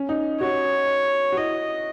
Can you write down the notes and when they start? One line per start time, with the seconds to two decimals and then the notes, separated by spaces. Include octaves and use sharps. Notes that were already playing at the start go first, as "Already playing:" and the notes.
Already playing: C#4
0.09 D#4
0.41 F#4 C#5
1.32 F#4
1.37 E4 D#5